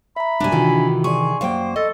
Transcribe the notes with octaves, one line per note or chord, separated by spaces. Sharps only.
E5 A#5 B5
F#2 B2 G3 D4 G#5
C3 D#3 E3 F4 F#4
G#4 D5 C6 C#6
F#2 A#3 C5 F5 G5
A4 D#5